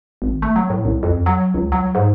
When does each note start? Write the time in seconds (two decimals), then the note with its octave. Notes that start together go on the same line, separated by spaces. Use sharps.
0.22 G#1
0.42 A3
0.56 F#3
0.70 A2
0.85 C2
1.03 F2
1.26 F#3
1.54 C#2
1.72 F#3
1.95 G#2